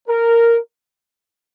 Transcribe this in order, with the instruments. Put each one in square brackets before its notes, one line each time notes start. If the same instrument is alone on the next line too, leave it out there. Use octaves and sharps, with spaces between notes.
[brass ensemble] A#4